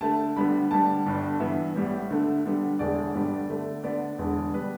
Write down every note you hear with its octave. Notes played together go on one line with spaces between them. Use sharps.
D2 D3 A3 A5
D2 D3 G3 B3 B5
D2 D3 G3 B3 A5
G1 G2 D3 G3
G2 E3 B3 E5
A1 A2 G3 B3
D2 D3 A3
D2 D3 G3 B3
E1 E2 D3 A3 D5
G1 G2 D3 G3 B3
D2 D3 A3
D2 D3 B3 D5
E1 E2 D3 B3
G3 B3 B4